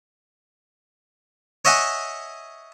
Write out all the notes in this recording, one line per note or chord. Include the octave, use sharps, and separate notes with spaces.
C#5 D#5 E5 F#5 G#5